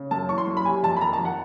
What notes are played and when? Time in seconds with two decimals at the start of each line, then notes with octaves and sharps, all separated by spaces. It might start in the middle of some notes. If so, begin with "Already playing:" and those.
Already playing: C#3
0.11 F#2 A5
0.29 E3 C#6
0.38 C6
0.47 F#2
0.57 B5
0.65 C3 G#5
0.83 F2 A5
0.97 B5
1.01 D#3 A#5
1.13 A5
1.19 F2
1.25 F#5